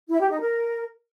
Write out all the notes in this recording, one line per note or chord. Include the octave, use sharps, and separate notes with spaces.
E4
G4
D#4
A#4